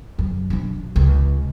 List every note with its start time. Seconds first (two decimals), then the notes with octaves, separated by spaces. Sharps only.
0.19 F#2
0.50 B1 D4
0.96 C#2